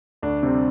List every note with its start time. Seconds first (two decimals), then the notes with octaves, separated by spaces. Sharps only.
0.22 D2 D4
0.43 C3 G3 C4